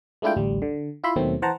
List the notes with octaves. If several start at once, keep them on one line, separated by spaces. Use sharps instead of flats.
G#3 A3 D4 E4 F4 G5
A1 D2 G3
D3
E4 F4 E5 B5 C6
D#2 B2 D#3 F#3 A3 C4
E3 C5 F#5 A5 A#5